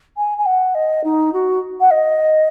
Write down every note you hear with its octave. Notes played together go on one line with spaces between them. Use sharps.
G#5
G#5
F#5
D#5
D#4
F#4
F#5
D#5